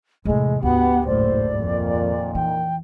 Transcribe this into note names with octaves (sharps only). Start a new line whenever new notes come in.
E2 A2 C3 G#3
D2 G#2 B3 F#4 G4 F#5
F#1 A2 C5 D5
F2 A#2 D#3
E3 G5